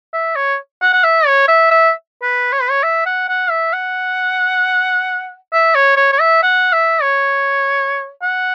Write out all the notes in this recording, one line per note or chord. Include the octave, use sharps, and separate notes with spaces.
E5
C#5
F#5
F#5
E5
C#5
E5
E5
B4
C#5
B4
C#5
E5
F#5
F#5
E5
F#5
E5
C#5
C#5
C#5
E5
F#5
E5
C#5
F#5